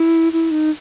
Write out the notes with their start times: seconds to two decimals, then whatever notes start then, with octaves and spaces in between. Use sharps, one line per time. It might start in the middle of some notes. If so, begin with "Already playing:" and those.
Already playing: E4
0.33 E4
0.51 D#4